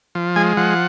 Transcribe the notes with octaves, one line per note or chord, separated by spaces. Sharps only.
F3
G#3 G#5
F3 F#5